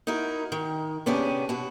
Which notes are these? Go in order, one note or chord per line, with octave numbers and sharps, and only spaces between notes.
D#4 E4 F#4 A#4
D#3
C3 B3 C#4 D4 G4 G#4
B2 F#4